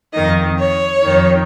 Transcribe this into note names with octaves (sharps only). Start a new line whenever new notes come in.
F2 D#3 D#5
C#5
F2 D#3